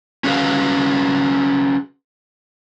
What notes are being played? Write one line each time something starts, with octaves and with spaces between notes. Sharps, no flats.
C#4 F#4 G#4 B4 F5